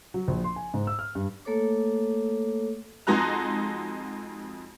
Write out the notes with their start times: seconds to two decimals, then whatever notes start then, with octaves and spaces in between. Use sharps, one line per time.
0.14 F#3
0.28 A#1
0.44 C6
0.56 G#5
0.74 G#2
0.87 E6
0.99 F6
1.15 G2
1.45 A3 A#3 A4 C#5 D6
3.07 F2 G#3 D#4 F#4 A#5 F#6